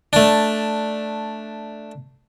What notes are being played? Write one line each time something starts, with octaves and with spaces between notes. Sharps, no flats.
A3 D4